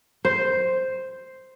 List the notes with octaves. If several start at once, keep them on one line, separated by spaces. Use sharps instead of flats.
C5